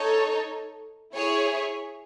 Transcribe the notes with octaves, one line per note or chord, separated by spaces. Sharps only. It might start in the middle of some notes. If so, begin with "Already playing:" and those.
Already playing: D#4 A4 C#5
E4 G#4 C#5